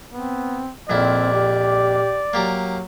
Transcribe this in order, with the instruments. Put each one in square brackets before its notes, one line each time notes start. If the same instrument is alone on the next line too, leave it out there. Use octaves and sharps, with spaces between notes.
[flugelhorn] B3 [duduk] C4
[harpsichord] A#1 F2 E4 [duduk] C4 [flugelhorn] D5
[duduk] G4
[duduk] F#3 [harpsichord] A#3 G4 A#5